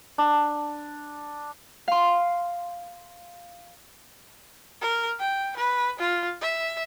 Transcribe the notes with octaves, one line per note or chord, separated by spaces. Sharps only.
D4
F5 C6
A#4
G5
B4
F4
E5